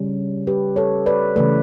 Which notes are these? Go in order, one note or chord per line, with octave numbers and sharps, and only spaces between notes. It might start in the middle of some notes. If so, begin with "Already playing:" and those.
Already playing: C#3 G3 C#4
G4 B4
A4 C#5
B4 D5
C#3 E3 A3 B4 D5